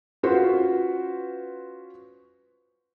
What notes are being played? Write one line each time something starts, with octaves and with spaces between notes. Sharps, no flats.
C#4 F4 F#4 B4 C5